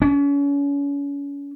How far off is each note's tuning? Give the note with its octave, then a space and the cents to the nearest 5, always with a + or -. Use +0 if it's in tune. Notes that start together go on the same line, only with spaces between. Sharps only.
C#4 +35